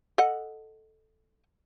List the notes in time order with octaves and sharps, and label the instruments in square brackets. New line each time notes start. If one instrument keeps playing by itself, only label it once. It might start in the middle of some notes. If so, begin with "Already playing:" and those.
[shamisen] A4 D#5 F#5